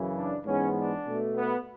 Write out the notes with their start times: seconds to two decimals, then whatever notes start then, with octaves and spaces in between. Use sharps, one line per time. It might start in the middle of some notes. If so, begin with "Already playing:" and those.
Already playing: F#2 C#3 E3
0.16 D4
0.46 G#2 E3 G#3 B3 C#4
0.76 D4
1.06 B2 A3
1.36 B3